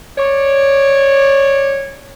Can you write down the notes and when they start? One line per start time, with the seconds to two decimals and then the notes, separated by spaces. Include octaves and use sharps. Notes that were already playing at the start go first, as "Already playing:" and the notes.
0.18 C#5 D5